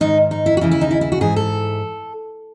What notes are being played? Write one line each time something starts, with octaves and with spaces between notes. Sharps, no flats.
G#2 D#3 D#4
D#4
E4
F#4
D#2 C#3 E3 E4
E4
D#4
E4
E4
F#4
G#2 E3 G#4
A4